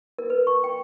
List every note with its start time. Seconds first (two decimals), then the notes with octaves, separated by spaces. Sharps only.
0.18 A#4
0.30 B4
0.47 C#6
0.64 G5